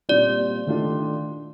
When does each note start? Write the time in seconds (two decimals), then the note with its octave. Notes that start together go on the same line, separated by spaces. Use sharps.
0.09 A#2 G3 C4 F4 D5
0.67 D#3 A3 D4 F4